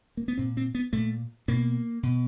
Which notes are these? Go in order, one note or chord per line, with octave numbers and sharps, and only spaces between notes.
A#3
B3
A#2 C4
C4
B3
A#2 A3
B2 A#3
B2